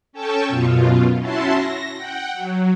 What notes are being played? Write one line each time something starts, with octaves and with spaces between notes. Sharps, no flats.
C#4 A4 G5 A5 C#6
F#2 B2 F4
C#4 E4 F#4 E5 A5 C6
A#6
F#5 G5
F#3